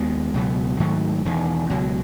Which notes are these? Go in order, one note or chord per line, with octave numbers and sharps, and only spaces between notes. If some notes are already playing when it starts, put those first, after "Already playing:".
Already playing: D#2 D#3 G#3 B3
C#2 B2 F#3 B3
G#2 D#3 F#3 A3
E1 E2 D#3
C#2 B2 F#3